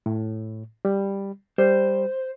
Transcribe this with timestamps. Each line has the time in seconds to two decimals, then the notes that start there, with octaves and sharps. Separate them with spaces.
0.06 A2
0.85 G3
1.58 G3 C5